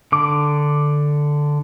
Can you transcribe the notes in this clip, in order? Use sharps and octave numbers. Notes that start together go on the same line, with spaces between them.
D3 D6